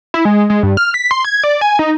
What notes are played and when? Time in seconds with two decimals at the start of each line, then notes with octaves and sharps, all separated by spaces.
0.14 E4
0.25 G#3
0.50 G#3
0.63 G2
0.77 F6
0.94 B6
1.11 C6
1.25 G#6
1.44 D5
1.61 G#5
1.79 D#4